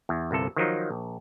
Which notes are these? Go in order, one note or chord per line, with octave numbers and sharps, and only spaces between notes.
E2
G1 C2 C3 A4
D#3 F3 F#3 D#4
A#1